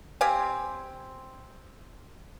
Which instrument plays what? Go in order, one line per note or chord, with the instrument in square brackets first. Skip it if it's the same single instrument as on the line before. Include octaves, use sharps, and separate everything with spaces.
[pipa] C4 G4 F5 G#5